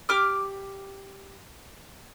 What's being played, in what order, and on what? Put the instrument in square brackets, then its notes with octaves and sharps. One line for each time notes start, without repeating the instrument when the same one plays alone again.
[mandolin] G4 D6 F6